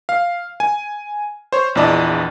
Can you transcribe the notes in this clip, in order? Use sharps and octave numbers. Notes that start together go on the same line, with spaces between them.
F5
G#5
C5 C#5
A#1 E2 E4 D5 D#5 A5